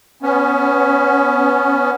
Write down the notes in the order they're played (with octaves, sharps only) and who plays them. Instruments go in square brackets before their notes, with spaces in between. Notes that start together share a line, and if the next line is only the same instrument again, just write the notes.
[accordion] B3 C#4